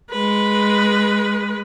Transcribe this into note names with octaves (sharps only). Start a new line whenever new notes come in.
G#3 B4